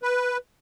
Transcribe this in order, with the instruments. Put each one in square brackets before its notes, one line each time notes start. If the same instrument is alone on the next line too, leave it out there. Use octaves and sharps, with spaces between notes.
[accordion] B4